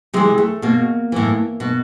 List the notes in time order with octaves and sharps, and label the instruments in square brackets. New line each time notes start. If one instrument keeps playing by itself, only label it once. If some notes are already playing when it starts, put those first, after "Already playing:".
[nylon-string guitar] C3 E3 G#3
A3
B2 A#3
A2 E3
B2